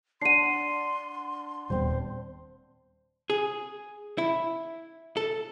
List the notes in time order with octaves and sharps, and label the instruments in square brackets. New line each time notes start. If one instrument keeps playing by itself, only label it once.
[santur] D4 F#5 [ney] C6 [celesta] C7 D#7
[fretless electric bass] D#1 G3 B3 [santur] C4 C5
[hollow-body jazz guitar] G#4
E4
A4